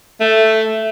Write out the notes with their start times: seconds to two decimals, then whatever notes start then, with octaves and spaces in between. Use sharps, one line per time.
0.21 A3